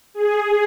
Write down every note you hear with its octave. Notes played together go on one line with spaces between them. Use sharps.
G#4